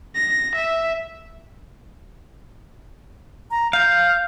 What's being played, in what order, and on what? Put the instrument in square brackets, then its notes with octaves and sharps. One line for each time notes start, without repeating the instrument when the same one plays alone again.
[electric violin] A#6
E5
[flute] A#5
[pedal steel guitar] F5 [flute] G6